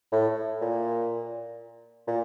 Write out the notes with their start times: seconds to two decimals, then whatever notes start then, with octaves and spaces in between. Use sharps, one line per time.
0.12 A2
0.61 A#2
2.07 A#2